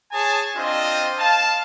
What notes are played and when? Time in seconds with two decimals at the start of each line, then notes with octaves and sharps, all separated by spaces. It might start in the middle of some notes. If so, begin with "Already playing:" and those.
0.12 G#4 C#5 G#5 A5
0.56 C4 D4 F4 C5 D#5
1.18 F5 A5